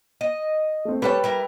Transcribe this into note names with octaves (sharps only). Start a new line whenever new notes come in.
D#5
A3 C4
G3 A4 B4 C#5 G5
G3 E4 A#4